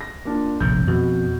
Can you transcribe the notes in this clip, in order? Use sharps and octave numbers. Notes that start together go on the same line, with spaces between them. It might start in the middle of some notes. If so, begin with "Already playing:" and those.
A#6
A#3 D4 F4
F1 A#1 A2 G6
F2 B2 F3